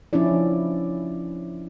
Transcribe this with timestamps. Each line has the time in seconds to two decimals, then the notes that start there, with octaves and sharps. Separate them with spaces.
0.13 F3 C#4 D4 E4 D5